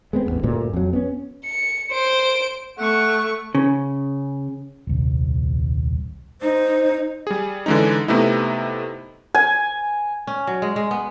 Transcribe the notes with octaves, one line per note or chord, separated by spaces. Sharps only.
G#3 B3 C4
A1 E2 A2 B3
D2 G2 A#2
F2 F#3
B3 C#4
C#7
C5 D7
A3 F#5 C#6
C#3
D#1 C2
D#4 C5
G3 G#4
D3 E3 G#3 C#4 D#4
C3 A3 B3 D#4 E4
G#5
C#4
F#3
G#3
G#3
B3